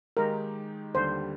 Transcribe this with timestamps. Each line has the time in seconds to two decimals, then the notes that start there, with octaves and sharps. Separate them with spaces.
0.17 D#3 G#3 D#4 G4 A#4
0.95 D#2 D3 G3 C5